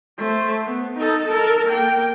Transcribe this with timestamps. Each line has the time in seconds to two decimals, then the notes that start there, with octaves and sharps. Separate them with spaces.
0.18 A3 C5
0.64 B3
0.97 D#4 A4
1.28 A4 A#4
1.66 A#3 G5